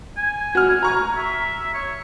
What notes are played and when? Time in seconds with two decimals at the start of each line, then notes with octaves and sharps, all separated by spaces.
0.17 G#5
0.55 F#4 F6
0.83 A#5 C#6
1.16 E5
1.74 C#5